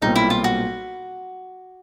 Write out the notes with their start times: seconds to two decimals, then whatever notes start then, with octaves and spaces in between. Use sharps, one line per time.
0.02 B1 A#2 G3 C4 D#4
0.16 E4
0.30 F4
0.44 F#4